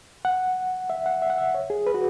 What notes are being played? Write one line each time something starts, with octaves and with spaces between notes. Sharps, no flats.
F#5
E5
F#5
E5
F#5
E5
C#5
G#4
B4
F#4